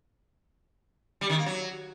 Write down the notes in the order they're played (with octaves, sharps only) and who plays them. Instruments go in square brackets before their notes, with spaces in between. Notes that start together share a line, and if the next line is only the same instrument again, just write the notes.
[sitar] G3
D#3
A#3
F#3